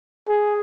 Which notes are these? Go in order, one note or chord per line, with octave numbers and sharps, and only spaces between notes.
G#4